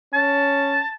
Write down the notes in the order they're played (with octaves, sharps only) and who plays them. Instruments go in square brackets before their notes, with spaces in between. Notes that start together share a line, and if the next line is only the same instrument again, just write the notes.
[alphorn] C#4 [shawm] A5